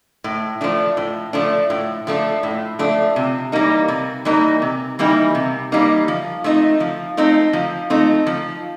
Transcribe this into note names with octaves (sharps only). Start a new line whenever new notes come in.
A2
F3 A3 D4
A2
F3 A3 D4
A2
F3 A3 D4
A2
F3 A3 D4
C3
E3 G3 A#3 D#4
C3
E3 G3 A#3 D#4
C3
E3 G3 A#3 D#4
C3
E3 G3 A#3 D#4
F3
A3 C4 D#4
F3
A3 C4 D#4
F3
A3 C4 D#4
F3